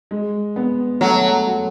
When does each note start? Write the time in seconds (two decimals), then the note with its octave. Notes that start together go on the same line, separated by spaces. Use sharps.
0.11 G#3
0.56 B3
1.01 F#3 A3
1.46 F#3